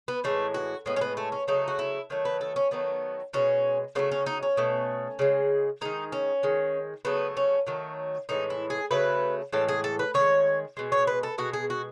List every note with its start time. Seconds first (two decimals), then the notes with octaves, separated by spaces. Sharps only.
0.08 B3
0.24 A2 E3 G#3 A3
0.54 F#4
0.86 A2 G#3 B3
0.96 C#4
1.01 B3
1.17 A3
1.32 C#4
1.48 C#3 F#3 A3 D#4
1.68 F#4
1.79 E4
2.10 D#3 F#3 A3
2.25 B4
2.41 A4
2.56 C#4
2.71 D#3 F#3 A3 B3
3.33 B2 G#3 C#4
3.95 C#3 F#3 A3 B3
4.11 C#4
4.26 D#4
4.43 C#4
4.57 B2 A3
5.19 C#3 G#3
5.81 D#3 G#3 D#4
6.12 C#4
6.43 D#3 G#3
7.05 C#3 F#3 A3 B3
7.37 C#4
7.67 D#3 F#3 A3
8.29 A2 E3 G#3 D#4
8.50 E4
8.70 G#4
8.91 C#3 F#3 A3 B4
9.52 A2 E3 G#3 A4
9.68 G#4
9.84 A4
9.99 B4
10.14 D#3 G#3 C#5
10.77 B2 G#3
10.92 C#5
11.07 B4
11.23 A4
11.38 B2 G#3 F#4
11.53 G#4
11.70 F#4